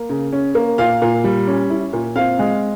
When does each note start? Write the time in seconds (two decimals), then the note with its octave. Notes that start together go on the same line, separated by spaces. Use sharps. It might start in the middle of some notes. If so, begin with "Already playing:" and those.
Already playing: A#3
0.09 C#3
0.33 C#4
0.55 A#3
0.78 A#2 F5
1.02 A#2
1.24 G3
1.47 C#4
1.70 E4
1.93 A#2
2.16 C4 F5
2.39 G#3